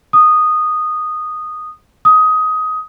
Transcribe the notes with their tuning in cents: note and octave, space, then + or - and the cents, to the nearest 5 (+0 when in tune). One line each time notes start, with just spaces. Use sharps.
D#6 -10
D#6 +15